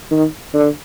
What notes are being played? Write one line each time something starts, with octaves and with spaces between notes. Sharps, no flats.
D#3
D3